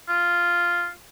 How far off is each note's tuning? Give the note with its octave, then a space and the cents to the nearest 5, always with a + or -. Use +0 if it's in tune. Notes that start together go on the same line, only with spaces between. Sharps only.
F4 -5